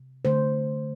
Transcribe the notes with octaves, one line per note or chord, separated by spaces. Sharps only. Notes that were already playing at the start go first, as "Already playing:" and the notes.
Already playing: C3
D3 A3 C5